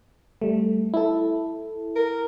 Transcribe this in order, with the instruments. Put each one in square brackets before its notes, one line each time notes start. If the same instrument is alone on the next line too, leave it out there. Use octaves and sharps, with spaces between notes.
[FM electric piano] G3 A3
E4 A4
[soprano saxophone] A#4